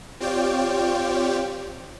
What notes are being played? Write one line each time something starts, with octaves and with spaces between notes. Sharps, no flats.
C4 F4 G4 C#5 D5 G5